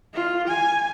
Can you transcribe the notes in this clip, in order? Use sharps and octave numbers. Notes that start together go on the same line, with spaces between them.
F4
G#5